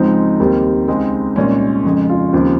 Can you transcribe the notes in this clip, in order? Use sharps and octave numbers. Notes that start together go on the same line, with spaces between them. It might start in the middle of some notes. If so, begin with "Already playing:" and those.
Already playing: C#2 C#3 F3 G#3 C4 D#4
D#2 D#3 G3 C4
C#2 C#3 G#3 C4
C2 A#2 G#3 C#4
F2 C#3 G#3
F4
D#2 C#3 F3 C4